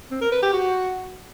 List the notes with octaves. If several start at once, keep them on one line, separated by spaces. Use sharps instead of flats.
C4
A#4
B4
G4
F#4